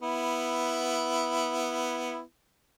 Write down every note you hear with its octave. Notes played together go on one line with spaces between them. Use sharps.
B3 E4